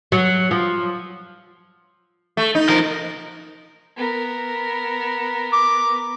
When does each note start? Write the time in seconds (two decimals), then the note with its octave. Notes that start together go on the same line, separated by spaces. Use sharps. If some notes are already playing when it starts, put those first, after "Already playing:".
0.12 F#3
0.51 F3
2.37 A3
2.55 D#4
2.69 F3 A#4
3.96 B3 A#4
5.53 D6